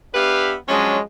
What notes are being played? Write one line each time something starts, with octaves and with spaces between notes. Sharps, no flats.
B3 D4 G4 B4 E5 F5
F3 F#3 G#3 C#4 D4 D#5